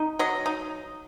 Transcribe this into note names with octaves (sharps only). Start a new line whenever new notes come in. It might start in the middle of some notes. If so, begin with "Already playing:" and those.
Already playing: D#4
F#3 D#5
D#4